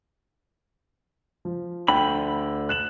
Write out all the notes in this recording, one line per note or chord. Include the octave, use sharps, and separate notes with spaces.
F3
D2 D3 G5 B5
F#6 E7 F#7